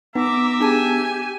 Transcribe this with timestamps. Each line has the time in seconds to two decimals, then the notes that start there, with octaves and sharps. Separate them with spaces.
0.15 B3 D#4 E5 A#5 D6
0.60 D4 G4 G#4 G#5 A5